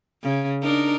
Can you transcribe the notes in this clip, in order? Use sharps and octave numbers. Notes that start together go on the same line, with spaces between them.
C#3
D4 D#4 A#4